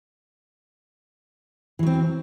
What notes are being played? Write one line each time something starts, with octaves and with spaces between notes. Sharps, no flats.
E3 F#3 C4